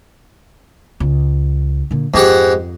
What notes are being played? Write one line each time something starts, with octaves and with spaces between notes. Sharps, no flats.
C#2
A#2 D3
F2 G#2 G4 F#5